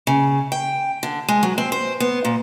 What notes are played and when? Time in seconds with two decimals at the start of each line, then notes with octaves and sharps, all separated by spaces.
0.07 C#3
0.52 G5
1.03 D3
1.28 G#3
1.43 F#3
1.58 C4
1.72 C5
2.00 B3
2.25 A#2